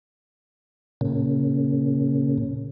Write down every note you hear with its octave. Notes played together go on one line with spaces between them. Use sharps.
A#2 C#3